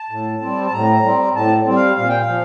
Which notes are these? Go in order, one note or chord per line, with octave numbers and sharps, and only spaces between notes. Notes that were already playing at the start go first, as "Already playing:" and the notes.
Already playing: A5
A2
G3 C4
A5
A2 A#5
G3 C4
A2 A5
G3 C4
F5
A#2 F5
G5
F5
F3